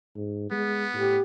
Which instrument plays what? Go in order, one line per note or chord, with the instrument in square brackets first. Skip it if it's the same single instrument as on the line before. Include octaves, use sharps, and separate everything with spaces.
[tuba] G#2
[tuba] G#3 [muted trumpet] B3
[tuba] A2 [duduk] G4